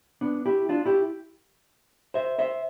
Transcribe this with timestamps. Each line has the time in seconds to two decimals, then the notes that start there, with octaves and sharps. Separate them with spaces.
0.21 B3 D4
0.46 E4 G4
0.69 D4 F4
0.85 E4 G4
2.14 C5 E5
2.39 C5 E5